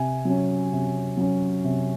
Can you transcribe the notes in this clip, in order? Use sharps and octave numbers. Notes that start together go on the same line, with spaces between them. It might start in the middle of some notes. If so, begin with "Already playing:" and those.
Already playing: C3 G#5
F#3 C#4
C3
F#3 C#4
C3